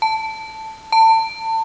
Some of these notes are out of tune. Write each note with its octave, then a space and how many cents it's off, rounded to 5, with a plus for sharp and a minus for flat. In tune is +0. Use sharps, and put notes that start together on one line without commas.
A5 +5
A5 +30